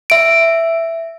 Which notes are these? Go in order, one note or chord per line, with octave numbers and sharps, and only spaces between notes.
E5 D7